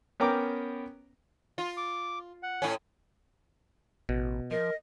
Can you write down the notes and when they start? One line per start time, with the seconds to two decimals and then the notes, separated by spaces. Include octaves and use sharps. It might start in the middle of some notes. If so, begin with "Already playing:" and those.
0.20 B3 C#4 A#4 G5 A#5 D6
1.58 F4
1.77 D6
2.43 F#5
2.62 A2 C#4
4.09 A1 B2
4.51 F3 A#4 D#5